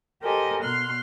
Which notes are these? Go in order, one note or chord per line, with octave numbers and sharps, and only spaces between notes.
G4 A4 A#4 C5 D#5 G#5
B2 C6 F6 F#6